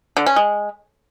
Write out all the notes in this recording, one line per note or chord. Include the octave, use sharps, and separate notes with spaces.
D3
C#4
G#3